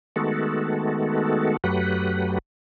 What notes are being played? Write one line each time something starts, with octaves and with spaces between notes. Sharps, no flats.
D#3 G#3 A3 B3 F#4 A4
F#2 F#3 A3 G4 B4 F#5